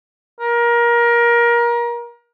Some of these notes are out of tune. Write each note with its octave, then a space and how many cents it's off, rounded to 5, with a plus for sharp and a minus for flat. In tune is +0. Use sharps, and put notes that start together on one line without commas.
A#4 +25